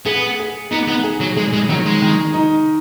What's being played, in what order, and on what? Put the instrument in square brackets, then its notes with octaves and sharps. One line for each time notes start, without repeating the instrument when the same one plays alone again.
[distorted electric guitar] B3 [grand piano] G#4
[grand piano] G#4
[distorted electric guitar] B3 [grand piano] D#4
[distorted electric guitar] B3
[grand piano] G#4
[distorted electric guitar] F#3
[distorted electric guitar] G#3 [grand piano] G#4
[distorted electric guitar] G#3
[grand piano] D#3 [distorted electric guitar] F#3
[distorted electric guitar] G#3
[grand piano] D#3
D#4